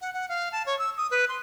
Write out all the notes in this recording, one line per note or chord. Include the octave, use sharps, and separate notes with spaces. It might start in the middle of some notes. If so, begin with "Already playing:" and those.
F#5
F#5
F5
A5
C#5
E6
D#6
B4
C6